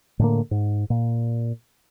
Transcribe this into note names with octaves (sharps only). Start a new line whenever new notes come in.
A2 D3 A#3
G#2
A#2